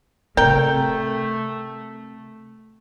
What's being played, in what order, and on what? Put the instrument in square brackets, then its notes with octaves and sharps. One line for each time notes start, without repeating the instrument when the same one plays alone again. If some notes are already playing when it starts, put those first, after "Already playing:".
[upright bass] C3 C4 [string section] A3 [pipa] A#4 G5